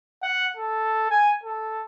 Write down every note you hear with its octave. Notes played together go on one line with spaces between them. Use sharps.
F#5
A4
G#5
A4